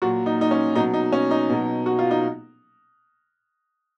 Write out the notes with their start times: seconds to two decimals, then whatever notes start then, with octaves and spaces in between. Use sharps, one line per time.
0.02 A#2 F#3 F#4
0.26 D#4
0.41 D#4
0.51 C#4
0.75 B2 F#3 D#4
0.94 D#4
1.12 C#4
1.31 D#4
1.50 B2 F#3
1.86 F#4
1.99 F4
2.11 D#4